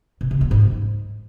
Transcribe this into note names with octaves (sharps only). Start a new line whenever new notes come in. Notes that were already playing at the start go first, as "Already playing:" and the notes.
B2
C#3
A#3
G#2
G#3